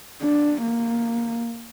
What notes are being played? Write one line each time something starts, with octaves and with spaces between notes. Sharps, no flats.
D4
A#3